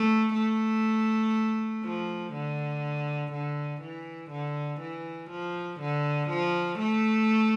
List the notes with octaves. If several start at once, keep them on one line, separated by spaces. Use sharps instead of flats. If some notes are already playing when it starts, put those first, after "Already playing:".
Already playing: A3
A3
F3
D3
D3
E3
D3
E3
F3
D3
F3
A3